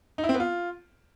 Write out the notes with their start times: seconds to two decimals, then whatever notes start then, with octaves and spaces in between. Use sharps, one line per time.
0.18 D#4
0.24 E4
0.29 C4
0.34 B3
0.40 F4